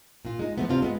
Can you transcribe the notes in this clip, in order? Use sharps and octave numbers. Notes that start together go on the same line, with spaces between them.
A#2 F4
G#3 D#4
F3 A3 B3
C3 C4 D4 F4
G#3 B3